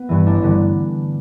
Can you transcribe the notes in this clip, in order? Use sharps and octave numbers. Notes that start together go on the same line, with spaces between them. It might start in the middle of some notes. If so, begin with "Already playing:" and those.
Already playing: B3
G2 E3
A1 D4
G2 D3